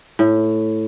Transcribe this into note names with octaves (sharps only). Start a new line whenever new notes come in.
A2